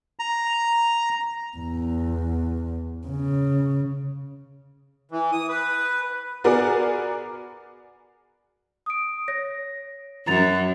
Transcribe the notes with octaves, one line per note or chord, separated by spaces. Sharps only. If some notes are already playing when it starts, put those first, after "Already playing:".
A#5
E2
C#3
E3
D#6
B4
B3 F#4 G#4 A#4 D5
D#6 D7
C#5 A#6
F#2 A#5 A6 F7